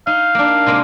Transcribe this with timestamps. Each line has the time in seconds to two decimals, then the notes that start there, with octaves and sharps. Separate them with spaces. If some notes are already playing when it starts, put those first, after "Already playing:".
0.07 D#4 F5
0.35 A#3 D4
0.66 C3 G#3 A#3